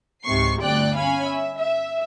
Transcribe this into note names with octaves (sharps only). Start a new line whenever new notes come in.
C#2 G#2 C3 C#6 C7
G1 D2 D5 G5 F#6
C#4 F5 G#5 B5
E5
E5